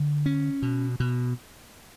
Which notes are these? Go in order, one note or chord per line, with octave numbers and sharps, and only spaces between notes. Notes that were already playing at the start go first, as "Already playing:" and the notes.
Already playing: D3
C#4
B2
B2